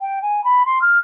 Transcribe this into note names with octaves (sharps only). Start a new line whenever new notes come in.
G5
G#5
B5
C6
F6